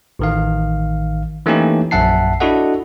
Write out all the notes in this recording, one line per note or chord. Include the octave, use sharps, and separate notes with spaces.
A1 D#3 F5
E3 A3 A#3 C#4 D#4 G4
A#1 F#2 E5 F#5 A5 C7
D4 E4 F#4 A4 D#5 F#5